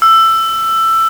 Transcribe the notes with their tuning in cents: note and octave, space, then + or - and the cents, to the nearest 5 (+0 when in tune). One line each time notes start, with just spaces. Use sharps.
E6 +15